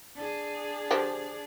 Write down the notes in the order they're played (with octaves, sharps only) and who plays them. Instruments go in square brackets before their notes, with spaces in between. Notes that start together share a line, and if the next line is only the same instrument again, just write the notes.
[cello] D4 G#4
[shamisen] D3 F3 G4